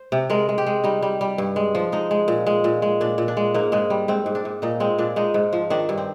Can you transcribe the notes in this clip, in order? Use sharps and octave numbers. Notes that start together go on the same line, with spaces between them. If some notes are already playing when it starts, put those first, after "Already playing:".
Already playing: C5
C3
G#3 A#4
G#3
G4
G#3
G3 D#4
G3
G3
G2
G#3
F3
G#3 D#4
G#3
A#2
G#3
A#2
G#3
A#2 D4
A#2
D4
G#3
G#2 A#3
G#2 G#3
G3
G#2 C4
G#2
D4
G#2
A#2 D#4
G#3 C4
A#2 D4
G#3 D#4
G#2
F3
D#3 D4
G2
C4